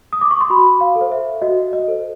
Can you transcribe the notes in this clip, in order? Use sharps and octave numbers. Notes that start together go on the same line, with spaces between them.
D#6
D6
C#6
C6
F#4 B5
F5
A4
C5
E5
F#4 D#5
D#5
A4 C5